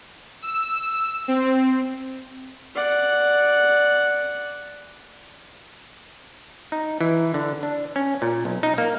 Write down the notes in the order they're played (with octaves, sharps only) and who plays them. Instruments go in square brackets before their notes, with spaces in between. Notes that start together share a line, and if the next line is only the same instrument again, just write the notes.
[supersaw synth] E6
C4
[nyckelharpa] D5 F#5
[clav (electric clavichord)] D#4
E3
D3
D4
C#4
A#2
B1
D#4
A#3